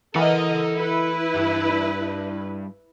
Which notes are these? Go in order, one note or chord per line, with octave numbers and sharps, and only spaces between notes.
E3 A4 A#4 D#5 F#5
E4 B4
G2